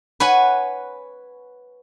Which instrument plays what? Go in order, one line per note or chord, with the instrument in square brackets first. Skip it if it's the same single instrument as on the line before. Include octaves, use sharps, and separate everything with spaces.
[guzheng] B4 C#5 F#5 G#5